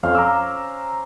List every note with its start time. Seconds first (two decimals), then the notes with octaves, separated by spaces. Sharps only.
0.03 F2 C#4 C5 F5
0.15 A#5 D6 E6